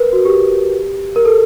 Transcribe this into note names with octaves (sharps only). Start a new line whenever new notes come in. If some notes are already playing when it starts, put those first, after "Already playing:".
Already playing: A#4 B4
F#4
G4
A#4
A4